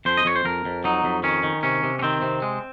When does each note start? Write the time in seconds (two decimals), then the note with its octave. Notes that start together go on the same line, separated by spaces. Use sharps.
0.05 F2 C5
0.17 D#5
0.25 F2 C#5
0.36 C5
0.45 F2 A#4
0.65 F2
0.84 F#3 D#4
1.04 F2
1.23 D#3 C#4
1.43 D#3
1.63 C3 C#4
1.83 C3
1.99 C#4
2.02 D#3 C4
2.22 C3
2.42 G#3